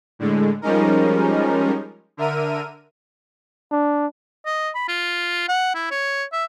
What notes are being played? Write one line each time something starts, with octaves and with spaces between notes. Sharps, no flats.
A2 D3 G#3
F3 G3 G#3 C#4 D#4 A#4
D3 A#4 E5 F6 D#7
D4
D#5
B5
F4
F#5
E4
C#5
E5